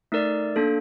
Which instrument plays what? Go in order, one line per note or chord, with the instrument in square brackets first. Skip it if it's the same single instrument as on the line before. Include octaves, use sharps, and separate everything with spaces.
[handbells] A3 D#4 A#4 D5
A#3 D4 A4